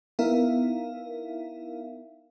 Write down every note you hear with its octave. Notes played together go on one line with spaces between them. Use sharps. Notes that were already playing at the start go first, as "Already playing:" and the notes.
B3 D#4 E4 A#4 E5 F5